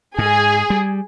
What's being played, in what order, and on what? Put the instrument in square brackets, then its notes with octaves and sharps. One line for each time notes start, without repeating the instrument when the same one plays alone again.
[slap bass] G#2 [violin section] G#4
[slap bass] G3